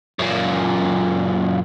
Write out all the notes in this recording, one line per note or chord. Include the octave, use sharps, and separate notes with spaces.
F#2 A#2